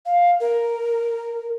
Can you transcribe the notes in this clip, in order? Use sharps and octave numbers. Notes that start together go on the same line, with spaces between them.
F5
A#4